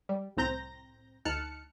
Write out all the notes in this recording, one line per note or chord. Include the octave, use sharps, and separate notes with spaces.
G3
C2 A2 C4 A#5 G6 A#6
D2 D#4 A5 F6 F#6 C#7